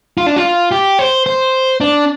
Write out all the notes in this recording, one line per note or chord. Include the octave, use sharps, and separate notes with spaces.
F4
D4
F4
G4
C5
C5
D4